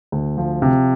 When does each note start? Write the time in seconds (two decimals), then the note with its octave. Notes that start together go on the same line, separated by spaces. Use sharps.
0.12 D2
0.38 F3
0.62 C3